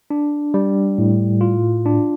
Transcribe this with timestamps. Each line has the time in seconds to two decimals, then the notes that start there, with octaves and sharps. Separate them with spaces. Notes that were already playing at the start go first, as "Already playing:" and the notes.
0.10 D4
0.54 G3
0.98 A2
1.41 F4
1.85 D4